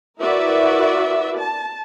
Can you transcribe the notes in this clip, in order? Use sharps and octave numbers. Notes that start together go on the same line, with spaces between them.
E4 F#4 A#4 B4 D5 E5
A5